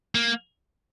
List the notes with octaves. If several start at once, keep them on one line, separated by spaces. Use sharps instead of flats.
A#3